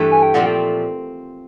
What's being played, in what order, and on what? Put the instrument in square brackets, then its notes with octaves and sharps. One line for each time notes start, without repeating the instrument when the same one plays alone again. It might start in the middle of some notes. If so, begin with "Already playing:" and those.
Already playing: [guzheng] G2 E3 A3
[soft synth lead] G#5
G5
[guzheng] A#2 F3 A3 C4 [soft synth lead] F#5
[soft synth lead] G5